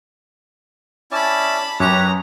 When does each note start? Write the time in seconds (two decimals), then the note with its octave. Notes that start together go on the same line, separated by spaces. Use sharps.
1.11 C#4 E4 D5 A5 B5
1.80 F#2 G4 B4 C#5 A#5